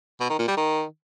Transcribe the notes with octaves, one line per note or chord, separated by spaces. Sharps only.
B2
D#3
A#2
G3
D#3